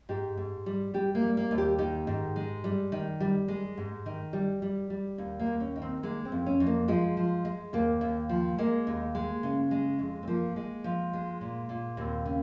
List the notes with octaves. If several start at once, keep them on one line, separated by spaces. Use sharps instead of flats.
G#2 G4
G#2
G3
G3 G4
A#3
G3
A#3
D#2
G4
D#3 G4
G#2
G#3
G3
D#3
G3
G#3
G#2
D#3
G3
G3
G3
D#2
A#3
D#2
C#4
D#3
C4
G#3 A#3
C4
F2
C#4
F2
A#3
F3 G#3
F3
G#3
D#2 A#3
D#2
F3
G#3 A#3
D#2
G#3
C#3
G#3
F2
C4
F3 A#3
G#3
F3
G#3
A#2
A#2
D#2 C4
C#3